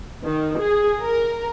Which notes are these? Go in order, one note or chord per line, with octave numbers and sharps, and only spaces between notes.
D#3
G#4
A#4